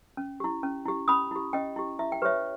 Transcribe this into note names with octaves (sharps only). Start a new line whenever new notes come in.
C#4
E4 G4
C#4
E4 G4
C#4 B5 D#6
E4 G4
C#4 D#5 G5
E4 G4
E4 E5
G5
G4 B4 C#5 E5